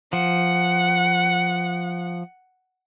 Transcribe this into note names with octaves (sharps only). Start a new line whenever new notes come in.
F3 F#5